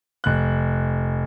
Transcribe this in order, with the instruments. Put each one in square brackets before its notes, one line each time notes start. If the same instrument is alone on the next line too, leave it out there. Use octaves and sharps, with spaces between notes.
[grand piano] F1 F#6